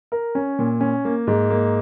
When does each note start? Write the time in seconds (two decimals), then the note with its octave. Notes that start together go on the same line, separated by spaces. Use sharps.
0.12 A#4
0.35 C#4
0.59 A#2
0.81 C#4
1.05 A#3
1.27 G#2
1.50 A#3